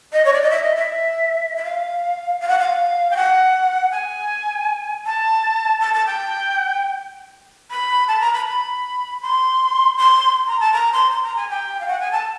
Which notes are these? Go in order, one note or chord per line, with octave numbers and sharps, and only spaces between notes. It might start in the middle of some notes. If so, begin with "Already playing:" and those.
D#5
C#5
D5
D#5
E5
D#5
E5
E5
F5
F5
F#5
F5
G5
F#5
G#5
A5
A5
A5
G5
B5
A5
A#5
B5
B5
C6
C6
A#5
A5
A#5
C6
C6
A#5
G#5
G5
F5
F#5
G#5
A5